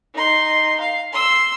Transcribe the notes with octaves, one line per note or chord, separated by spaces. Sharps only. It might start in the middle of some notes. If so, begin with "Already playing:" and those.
D#4 C6
F5
C6 E6